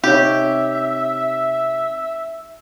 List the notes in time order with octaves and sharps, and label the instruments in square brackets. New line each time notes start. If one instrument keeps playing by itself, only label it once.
[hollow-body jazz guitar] C3 [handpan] D#4 C#5 [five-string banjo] G4 [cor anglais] E5